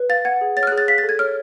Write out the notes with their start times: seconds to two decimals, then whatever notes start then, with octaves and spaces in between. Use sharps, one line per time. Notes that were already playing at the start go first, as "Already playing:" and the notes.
Already playing: B4
0.09 F5 A6
0.25 F#5 G#6
0.41 G#4
0.57 C#5 A6
0.63 F6
0.67 F#6
0.72 G#4
0.78 A6
0.88 F5 B6
0.98 A6
1.03 A4
1.09 G#6
1.19 C#5 F6